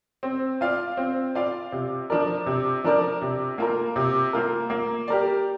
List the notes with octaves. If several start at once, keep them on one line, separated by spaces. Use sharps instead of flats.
C4
F4 D5 F5
C4
F4 D5 F5
C3
F3 D4 A#4 D5
C3
F3 D4 A#4 D5
C3
A#3 F4 A#4
C3
A#3 F4 A#4
A#3
G4 A#4 D5